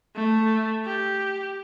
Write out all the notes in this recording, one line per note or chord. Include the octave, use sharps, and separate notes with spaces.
A3
G4